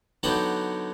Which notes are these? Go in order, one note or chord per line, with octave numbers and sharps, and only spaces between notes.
D3 F#3 B3 D#4 F#5 G5